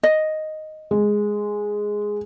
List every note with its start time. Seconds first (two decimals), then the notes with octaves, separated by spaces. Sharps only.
0.03 D#5
0.91 G#3